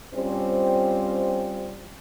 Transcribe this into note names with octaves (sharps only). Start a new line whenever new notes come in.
G3 C4 C#4 F4 C5